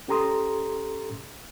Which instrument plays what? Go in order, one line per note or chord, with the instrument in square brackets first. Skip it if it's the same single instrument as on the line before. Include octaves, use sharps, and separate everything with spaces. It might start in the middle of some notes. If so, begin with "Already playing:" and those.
[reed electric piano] C#4 G4 A4 A#5 C6 D#6